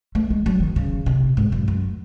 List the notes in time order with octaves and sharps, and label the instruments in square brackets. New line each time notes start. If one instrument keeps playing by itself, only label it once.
[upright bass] A3
G#3
F#3
D#3
C#3
C3
G#2
F#2
F#2